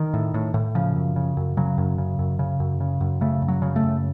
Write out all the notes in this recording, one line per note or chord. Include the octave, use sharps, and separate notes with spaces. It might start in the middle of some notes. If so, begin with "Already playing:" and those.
Already playing: D#3
A2
A2
A2
C#3 F3
F#2
C#3
F#2
C#3 F#3
F#2
C#3
F#2
C#3
F#2
C#3
F#2
C#3 A3
F#2
F#3
C#3
A3
F#2